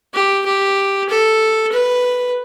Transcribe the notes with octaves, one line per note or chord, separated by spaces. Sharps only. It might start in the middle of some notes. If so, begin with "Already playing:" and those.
G4
G4
A4
B4